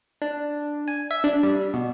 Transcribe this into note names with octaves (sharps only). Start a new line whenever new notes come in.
D4
G#5
E5
D4
G3
B2